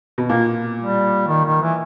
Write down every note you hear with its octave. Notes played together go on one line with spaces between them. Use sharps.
B2
A#2 A#3
G3
D#3
D#3
E3